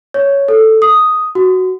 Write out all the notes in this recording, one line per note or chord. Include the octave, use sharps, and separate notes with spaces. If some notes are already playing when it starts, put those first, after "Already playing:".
C#5
A4
D#6
F#4